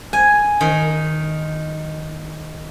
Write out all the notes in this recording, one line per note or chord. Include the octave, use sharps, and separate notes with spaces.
G#5
D#3